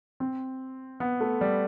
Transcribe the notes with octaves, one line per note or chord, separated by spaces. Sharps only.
C4
B3
A3
G3